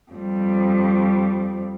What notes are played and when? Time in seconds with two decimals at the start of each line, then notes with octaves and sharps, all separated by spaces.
0.12 F2 G3